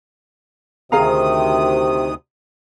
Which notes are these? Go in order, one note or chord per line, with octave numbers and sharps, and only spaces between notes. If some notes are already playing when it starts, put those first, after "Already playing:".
D2 C3 D#3 G#4 F5 A#5 D#6